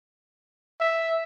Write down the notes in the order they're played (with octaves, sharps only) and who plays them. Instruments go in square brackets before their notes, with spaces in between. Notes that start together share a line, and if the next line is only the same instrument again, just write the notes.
[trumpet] E5